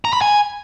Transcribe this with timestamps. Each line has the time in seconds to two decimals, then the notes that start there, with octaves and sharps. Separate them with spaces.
0.05 A#5
0.13 B5
0.21 G#5